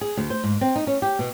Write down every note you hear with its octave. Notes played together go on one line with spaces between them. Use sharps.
G#4
D2
C5
G#2
C4
D#4
C#4
G4
B2